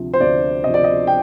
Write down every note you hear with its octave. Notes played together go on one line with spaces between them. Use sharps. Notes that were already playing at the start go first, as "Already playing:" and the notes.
Already playing: D2 C3 F3
C5
D2 D5
C3 F3 D#5
D5
D#5
G5